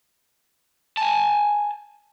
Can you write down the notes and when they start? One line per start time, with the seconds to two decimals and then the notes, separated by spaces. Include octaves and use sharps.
0.97 G#5 A5